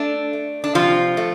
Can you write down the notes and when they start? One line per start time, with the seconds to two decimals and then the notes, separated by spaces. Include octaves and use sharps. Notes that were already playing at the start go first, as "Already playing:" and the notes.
Already playing: A3 D4
0.33 A3
0.64 D4
0.75 C3 F3 F4
1.17 A3